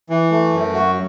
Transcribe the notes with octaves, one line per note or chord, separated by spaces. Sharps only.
E3
A3
F#2
F#4